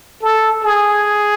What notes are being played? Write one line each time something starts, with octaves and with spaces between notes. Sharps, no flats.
A4
G#4